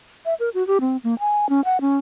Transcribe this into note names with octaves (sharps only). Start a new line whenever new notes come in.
E5
A#4
F#4
G4
C4
A#3
G#5
C#4
F#5
C#4